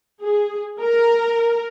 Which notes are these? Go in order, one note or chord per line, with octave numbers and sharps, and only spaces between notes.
G#4
A#4